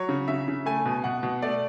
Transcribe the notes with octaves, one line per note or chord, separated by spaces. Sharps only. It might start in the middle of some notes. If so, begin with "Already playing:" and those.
Already playing: F#3 C#5
C#3
C#3 E5
C#3
A3 G#5
B2
B2 F#5
B2
A3 D5